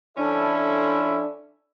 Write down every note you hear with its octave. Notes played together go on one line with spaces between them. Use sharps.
F3 C#4 D4 E4 A4 E5